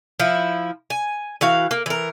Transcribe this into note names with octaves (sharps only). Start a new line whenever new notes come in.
F3 E4
G#5
E3 F#4 F5
A#3
E3 A#4